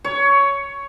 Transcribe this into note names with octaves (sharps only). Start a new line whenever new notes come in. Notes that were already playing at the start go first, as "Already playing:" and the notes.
C#5